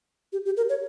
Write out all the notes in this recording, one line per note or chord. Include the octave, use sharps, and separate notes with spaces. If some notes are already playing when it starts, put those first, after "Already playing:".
G4
G4
A#4
C#5